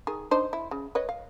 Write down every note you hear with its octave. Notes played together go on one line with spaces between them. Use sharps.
D#3 G#4
D4 D#4 C5
E4
C#3
B4 C#5 D#5
F5